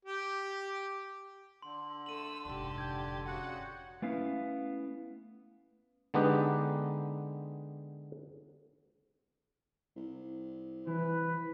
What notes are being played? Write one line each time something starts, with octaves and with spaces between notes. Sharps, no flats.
G4
D3 C6
A3 E6 D#7 F#7
F1 G#2 D4 G4
G6 G#6
C#3 F#4 F#5
A3 B3 C#4 E4 F5
D3 G#3 B3 D#4 G4 B4
C2
E3 B4